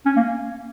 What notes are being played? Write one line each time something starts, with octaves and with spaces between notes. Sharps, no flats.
C#4
A#3